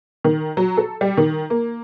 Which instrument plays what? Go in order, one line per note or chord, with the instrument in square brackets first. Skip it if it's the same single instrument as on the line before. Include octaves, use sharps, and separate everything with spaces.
[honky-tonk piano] D#3
F#3
A4
G3
D#3
A#3